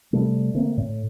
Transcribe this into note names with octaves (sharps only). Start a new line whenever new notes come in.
C3 G3 A3
D3 A3 A#3 C4
A2